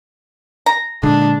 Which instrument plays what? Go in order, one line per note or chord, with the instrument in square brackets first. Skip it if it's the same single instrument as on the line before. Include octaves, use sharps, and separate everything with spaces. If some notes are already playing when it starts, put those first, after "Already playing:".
[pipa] A#5
[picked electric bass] A#2 D3 G#3 [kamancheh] D4